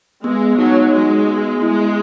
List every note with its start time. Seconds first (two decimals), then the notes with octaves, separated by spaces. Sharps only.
0.24 G#3 B3
0.59 F#3 D#4
0.92 G#3 F#4
1.27 B3
1.62 G#3 E4